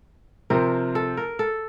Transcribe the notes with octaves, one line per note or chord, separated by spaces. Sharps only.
C3 F3 C4 A#4
A4
A#4
A4